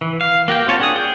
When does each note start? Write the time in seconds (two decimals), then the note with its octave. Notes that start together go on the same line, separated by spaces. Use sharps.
0.01 E3
0.21 F5
0.48 A#3 F#4 G4 G5
0.67 C4 F4 C#5 G#5 A5
0.80 D4 G#4 D#6
0.96 G#4 G5